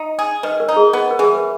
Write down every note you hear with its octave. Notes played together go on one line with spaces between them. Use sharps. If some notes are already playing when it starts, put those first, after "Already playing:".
Already playing: D#4
G#4
D#3 B4
A#4
D#4
G#4
B3
A#4
E3 G#4
B4